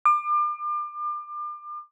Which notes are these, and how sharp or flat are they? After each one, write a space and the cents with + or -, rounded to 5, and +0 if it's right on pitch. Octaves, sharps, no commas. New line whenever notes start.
D6 +35